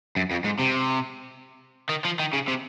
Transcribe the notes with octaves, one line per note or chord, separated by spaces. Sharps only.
F#2
F2
G#2
C3
D#3
F3
D#3
C#3
C3